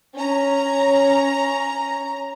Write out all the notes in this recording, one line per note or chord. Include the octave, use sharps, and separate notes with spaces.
C#4 A#5